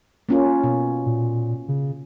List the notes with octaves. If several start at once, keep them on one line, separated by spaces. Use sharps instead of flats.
A#3 C#4 F4
B2
A#2
C#3